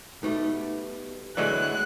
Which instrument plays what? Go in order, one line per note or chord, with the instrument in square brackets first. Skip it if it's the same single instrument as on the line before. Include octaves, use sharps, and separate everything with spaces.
[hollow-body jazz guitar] B2 G3 A3 [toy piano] D#4
[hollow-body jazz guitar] E2 D3 A3 [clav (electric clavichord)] E3 F#3 G#3 [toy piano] D5 [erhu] F#6